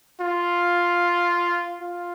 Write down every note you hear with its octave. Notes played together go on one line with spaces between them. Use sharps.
F4
F4